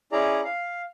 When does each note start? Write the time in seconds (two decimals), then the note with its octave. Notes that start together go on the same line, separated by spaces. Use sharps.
0.12 C#4 E4 G#4 D5 A#5
0.44 F5